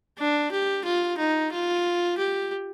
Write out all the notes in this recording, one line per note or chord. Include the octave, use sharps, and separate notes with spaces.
D4
G4
F4
D#4
F4
G4